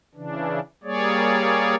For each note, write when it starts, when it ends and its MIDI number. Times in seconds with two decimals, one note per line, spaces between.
0.15 0.60 49
0.15 0.60 52
0.15 0.60 62
0.83 1.75 55
0.83 1.75 58
0.83 1.75 68
0.83 1.75 73
0.83 1.75 74